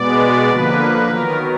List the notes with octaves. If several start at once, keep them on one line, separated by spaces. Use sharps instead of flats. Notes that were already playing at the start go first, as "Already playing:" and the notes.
Already playing: B2 G#3 B3 D5
D3 F3 A#3 B4
D#3 F#3 B3 A#4